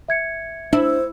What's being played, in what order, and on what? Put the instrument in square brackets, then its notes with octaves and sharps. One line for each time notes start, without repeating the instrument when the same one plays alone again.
[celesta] E5 G#6 C#7
[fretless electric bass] D4 [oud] E4 [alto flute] C5